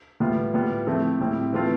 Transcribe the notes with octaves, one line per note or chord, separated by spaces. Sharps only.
A2 E3 G3 B3 F4
A2 G3 B3 F4
F3 A3 C4 E4
A2 G3 C4 E4
E3 A3 C4 F4